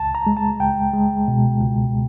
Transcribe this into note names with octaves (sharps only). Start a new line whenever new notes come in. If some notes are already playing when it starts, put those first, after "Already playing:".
Already playing: C#2 A5
A#5
G#3
A5
C#2 G5
G#3
B2
C#2